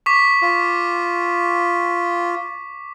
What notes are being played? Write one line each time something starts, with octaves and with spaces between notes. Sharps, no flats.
C#6 D6 B6
F4